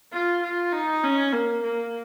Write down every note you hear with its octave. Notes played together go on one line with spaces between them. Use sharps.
F4
F4
D#4
C#4
A#3
A#3